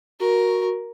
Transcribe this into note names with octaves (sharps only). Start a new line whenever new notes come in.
F#4 A#4